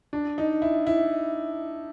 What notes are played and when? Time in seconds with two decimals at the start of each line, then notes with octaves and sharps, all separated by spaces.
0.13 D4
0.38 D#4
0.62 E4
0.87 E4